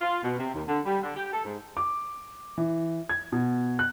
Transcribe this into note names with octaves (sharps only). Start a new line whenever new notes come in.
F4
B2
C3
D#2
D3
G3
D3
G4
A4
G#2
D6
E3
G#6
B2
F#6